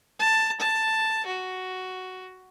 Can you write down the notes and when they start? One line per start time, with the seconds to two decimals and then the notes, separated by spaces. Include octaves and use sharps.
0.19 A5
0.60 A5
1.26 F#4